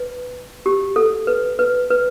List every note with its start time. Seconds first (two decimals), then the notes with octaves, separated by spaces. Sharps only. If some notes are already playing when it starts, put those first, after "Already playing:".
Already playing: B4
0.66 G4
0.96 A4
1.27 B4
1.59 B4
1.90 B4